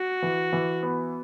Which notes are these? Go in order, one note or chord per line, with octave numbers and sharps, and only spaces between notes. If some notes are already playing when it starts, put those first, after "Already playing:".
Already playing: F#4
E3
E3
B3